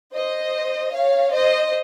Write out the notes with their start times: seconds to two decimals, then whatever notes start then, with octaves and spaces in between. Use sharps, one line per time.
0.14 C5 D#5
0.93 C#5 F5
1.31 C5 D#5